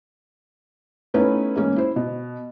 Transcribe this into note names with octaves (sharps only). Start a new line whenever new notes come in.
A3 B3 C#4 D#4 E4 B4
A1 G#2 A#3 C#4
E4 C5
B2